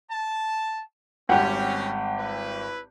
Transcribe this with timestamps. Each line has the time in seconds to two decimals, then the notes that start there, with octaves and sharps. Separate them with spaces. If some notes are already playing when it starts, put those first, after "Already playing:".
0.10 A5
1.29 G#1 G3 C4 C#4 G4 F#5 G5
2.18 E4 B4